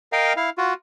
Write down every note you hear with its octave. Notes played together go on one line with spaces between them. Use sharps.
A#4 D#5 F5 G5
E4 F5
F4 F#4